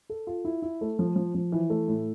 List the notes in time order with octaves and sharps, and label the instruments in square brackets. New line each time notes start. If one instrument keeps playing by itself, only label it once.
[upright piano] A4
F4
E4
E4
A3
F3
F3
F3
E3
A3
A2